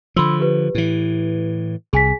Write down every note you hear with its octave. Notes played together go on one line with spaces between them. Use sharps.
D3 F3 B5 C6 E6
G4 B4
A2 E3
C2 G#4 G#5 B6